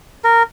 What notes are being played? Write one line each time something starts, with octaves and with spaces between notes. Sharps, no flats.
A#4